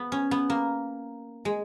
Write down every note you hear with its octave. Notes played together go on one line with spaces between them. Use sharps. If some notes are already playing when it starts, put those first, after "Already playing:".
Already playing: B3
C#4
B3
A#3
G#3